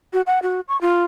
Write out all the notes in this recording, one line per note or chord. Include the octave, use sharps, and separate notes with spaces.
F#4
F#5
F#4
C#6
F4